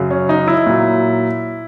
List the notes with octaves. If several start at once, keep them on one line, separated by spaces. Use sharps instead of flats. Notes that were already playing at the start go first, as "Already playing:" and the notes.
Already playing: F#2 C#3 F#3
C#4
D#4
E4
A#2 F#3